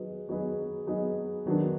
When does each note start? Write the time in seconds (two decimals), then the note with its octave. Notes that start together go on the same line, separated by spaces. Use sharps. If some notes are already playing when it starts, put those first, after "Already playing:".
Already playing: F#3 B3 D#4 G#4 B4
0.29 F#3 B3 D#4 G#4 B4
0.87 F#3 B3 D#4 G#4 B4
1.46 D#3 F#3 B3 D4